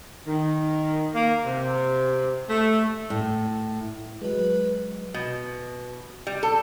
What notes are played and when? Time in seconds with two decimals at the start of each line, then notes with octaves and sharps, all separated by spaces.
0.27 D#3
1.14 A#3
1.45 C3
2.50 A3
3.10 A2
4.22 F#3 G#3 B4
5.14 B2
6.27 G3
6.43 A4